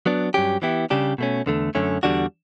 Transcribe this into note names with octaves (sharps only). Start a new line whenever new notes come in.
F#3 B3 D4
G2 F#3 C#4 G4
E3 B3 E4 G4
C#3 G3 D4 G4
B2 A3 C#4
E2 D3 A3
F#2 D3 A3 C#4
E2 D3 G3 D4 F#4